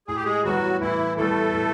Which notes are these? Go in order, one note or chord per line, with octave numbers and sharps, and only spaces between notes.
A2 G#4
G4
G#3 G#4
E3 F#3 G3 B3 F#4
A2 E3 E4
E3 G3 A3 B3 A4
A2